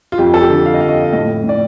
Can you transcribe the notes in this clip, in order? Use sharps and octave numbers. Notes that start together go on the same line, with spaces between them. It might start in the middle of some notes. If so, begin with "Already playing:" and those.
F4
F2 G4
A4
G4
D3
F5
D#5
F2 F5
D#5
A2 D#5
A2
D5